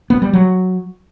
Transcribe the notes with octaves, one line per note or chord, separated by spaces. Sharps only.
B3
G3
F#3